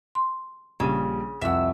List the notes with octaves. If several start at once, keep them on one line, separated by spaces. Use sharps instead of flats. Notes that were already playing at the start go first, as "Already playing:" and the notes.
C6
A#1 C#3 G3 D#7
C2 F2 E5 F#5 E6